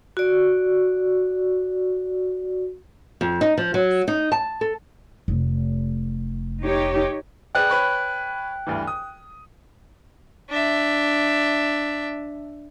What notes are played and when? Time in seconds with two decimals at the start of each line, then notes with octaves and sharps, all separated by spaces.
0.17 F#4 D5
3.21 F2
3.41 D#4
3.58 F3
3.74 F#3
4.08 D#4
4.32 A5
4.61 A4
5.28 F1
6.63 D#4 G4 C#5
7.55 G#4 B4 D5 G5 F#6
7.70 B4 C#5 B5
8.67 D2 G2 E3
8.87 D#6
10.49 D4 E5